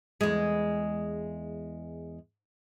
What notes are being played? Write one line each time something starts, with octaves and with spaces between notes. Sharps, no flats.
E2 G#3